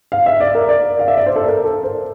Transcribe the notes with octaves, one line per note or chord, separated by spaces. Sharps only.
F5
E5
D5
A#4
D5
F5
E5
D5
C5
A4
A#4
A4
C5